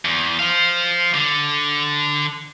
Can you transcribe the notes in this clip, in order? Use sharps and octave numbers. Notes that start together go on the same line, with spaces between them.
E2
C5 F5
D3